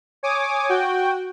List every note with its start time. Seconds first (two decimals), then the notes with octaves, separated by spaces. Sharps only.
0.23 C#5 G#5 D6 D#6
0.69 F#4 G5